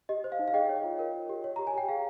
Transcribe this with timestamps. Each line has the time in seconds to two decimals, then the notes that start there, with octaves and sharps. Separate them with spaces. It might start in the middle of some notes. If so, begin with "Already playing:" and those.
0.09 G4 D#5
0.24 C5
0.32 F5
0.39 D#4
0.48 F5
0.53 G#4 D#5 G5
0.69 C#5
0.84 F4
0.99 A#4
1.14 C#5
1.29 G4
1.44 C#5
1.56 G4 A#5
1.67 G#5
1.74 G4 G5
1.89 G#4 F5